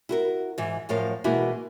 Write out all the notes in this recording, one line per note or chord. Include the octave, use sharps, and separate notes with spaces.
E4 F#4 A#4
G#2 E3
F#2 A2 F3 A#4 F5
B2 E3 G#3 A#3 E4 F#4